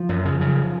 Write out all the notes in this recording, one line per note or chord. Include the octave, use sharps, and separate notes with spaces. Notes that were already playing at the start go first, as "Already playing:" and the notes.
Already playing: F3
F#2
C#3
C#3